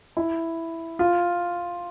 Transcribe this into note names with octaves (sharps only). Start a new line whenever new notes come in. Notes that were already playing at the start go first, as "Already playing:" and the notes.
E4
F4